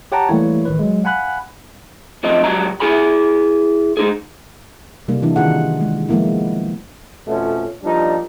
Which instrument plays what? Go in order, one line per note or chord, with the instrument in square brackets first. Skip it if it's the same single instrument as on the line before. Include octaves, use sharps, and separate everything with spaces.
[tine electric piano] G4 C#5 F#5 G5 A5 A#5
E3 G3 A3 A#3 E4 C#5
A1 D#3 B4
F#3 G#3
F5 F#5 G#5 B5 F#6
[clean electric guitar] C#3 F3 C4 D#5
C#2 F#3 G3 A#5
E4 G#4 G#5 B5
G#3 D#4 G#4
[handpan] C3 G3 A#3 D#4
E3 D4 E4
D#3 D#4 F4 G#4 F#5
G#3
F3 G#3 A#3 B3 E4
[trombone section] F2 B2 F3 A3 C#4
F3 G3 A#3 D4 D#4